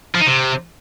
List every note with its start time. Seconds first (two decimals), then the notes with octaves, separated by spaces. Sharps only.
0.15 F3
0.21 D#4
0.27 C3